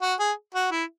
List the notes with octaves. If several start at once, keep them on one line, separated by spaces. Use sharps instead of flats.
F#4
G#4
F#4
E4